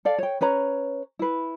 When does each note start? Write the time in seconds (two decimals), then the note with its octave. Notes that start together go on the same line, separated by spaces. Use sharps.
0.05 A4 D5 F5
0.19 C#5 G5
0.41 C#4 B4 C#5 A#5
1.19 E4 B4